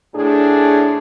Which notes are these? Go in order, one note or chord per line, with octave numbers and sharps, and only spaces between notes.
A2 D4 G#4